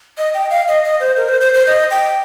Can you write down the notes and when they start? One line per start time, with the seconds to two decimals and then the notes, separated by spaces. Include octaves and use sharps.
0.18 D#5
0.34 G5
0.50 F5
0.68 D#5
0.84 D#5
1.00 C5
1.17 A#4
1.29 C5
1.41 C5
1.54 C5
1.67 D#5
1.91 G5